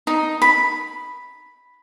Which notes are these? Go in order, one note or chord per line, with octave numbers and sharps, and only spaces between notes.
D#4
B5